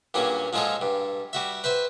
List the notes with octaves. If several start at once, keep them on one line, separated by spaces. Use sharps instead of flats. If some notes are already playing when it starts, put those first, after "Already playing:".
G2 A#2 F#3 C#4 G#4
F3 F#3 G#3 F4 G#4 A4
G2
G3 F#4 E5
B4 C5 E5